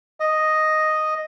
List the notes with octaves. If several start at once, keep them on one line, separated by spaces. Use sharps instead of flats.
D#5